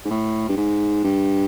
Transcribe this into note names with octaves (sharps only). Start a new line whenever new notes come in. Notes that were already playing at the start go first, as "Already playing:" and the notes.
G#2
A2
G2
G#2
G2